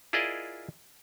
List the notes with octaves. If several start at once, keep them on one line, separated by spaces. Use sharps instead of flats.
E4 F4 G#4 A#4 D5 D#5